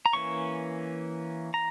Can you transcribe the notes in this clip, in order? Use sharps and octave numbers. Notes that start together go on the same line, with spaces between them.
A#5
E3 A#3 C#4 C#6
A#5